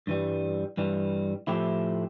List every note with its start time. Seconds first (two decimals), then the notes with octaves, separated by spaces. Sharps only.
0.07 G2 E3 G3
0.77 G2 E3 G3
1.47 A2 F3 A3 E4 G4